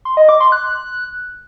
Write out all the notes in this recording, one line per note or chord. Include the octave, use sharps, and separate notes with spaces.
C6
D#5
D6
C6
F#6